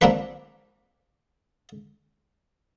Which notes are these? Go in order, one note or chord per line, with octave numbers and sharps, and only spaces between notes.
A#3 C4 D4 F4 B4